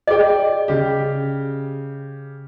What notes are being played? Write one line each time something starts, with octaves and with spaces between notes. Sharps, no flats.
G#4 D5 D#5 G5
C#3 G4